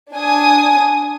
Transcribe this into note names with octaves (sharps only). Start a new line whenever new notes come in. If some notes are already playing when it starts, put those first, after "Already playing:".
D4 G#5 D#6